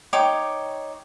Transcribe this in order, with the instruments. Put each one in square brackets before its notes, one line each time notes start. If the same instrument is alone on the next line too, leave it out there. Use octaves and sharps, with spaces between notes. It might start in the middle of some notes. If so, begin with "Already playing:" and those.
[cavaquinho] D#4 C#5 G5 D6